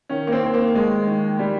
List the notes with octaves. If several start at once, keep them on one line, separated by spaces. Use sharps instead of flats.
D#3 C#4
A#3
C4
D#2
A#3
D#2 G#3
D#3
G3